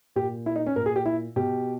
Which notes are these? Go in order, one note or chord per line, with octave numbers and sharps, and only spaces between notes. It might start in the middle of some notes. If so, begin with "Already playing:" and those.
A#2 G4
E4
D#4
C#4
A#2 A#4
G#4
G4
E4
B2 G4